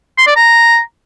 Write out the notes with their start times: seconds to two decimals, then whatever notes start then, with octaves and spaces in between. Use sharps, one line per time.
0.18 C6
0.27 D5
0.36 A#5